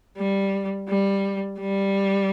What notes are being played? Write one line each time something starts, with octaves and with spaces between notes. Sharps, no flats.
G3
G3
G3